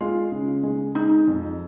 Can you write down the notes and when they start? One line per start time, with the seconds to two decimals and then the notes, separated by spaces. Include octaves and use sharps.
0.01 G#3 F4
0.32 C#3
0.63 G#3
0.95 G#3 D#4
1.28 F2